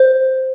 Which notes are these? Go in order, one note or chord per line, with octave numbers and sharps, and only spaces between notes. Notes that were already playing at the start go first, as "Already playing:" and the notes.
Already playing: C5